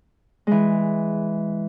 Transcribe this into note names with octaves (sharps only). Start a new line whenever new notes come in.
E3 G#3